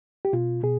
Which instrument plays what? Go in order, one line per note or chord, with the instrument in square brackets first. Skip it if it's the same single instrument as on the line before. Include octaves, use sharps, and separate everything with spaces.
[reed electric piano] G4
B2 F4
B2 G#4